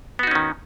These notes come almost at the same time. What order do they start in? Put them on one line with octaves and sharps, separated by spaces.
B3 F#4 D#4 C#4 D#3